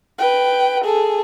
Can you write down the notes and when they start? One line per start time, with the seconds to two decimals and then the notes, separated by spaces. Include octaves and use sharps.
0.19 B4 G5
0.84 G#4 A4